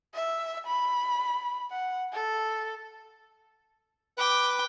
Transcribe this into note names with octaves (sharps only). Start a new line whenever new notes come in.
E5
B5
F#5
A4
B4 G5 D6